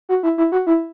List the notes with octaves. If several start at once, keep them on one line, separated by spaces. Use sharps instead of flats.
F#4
E4
E4
F#4
E4